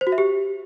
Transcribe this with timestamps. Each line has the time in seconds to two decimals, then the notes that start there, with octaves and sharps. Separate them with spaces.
0.01 C5
0.07 F#4
0.12 E5
0.18 G4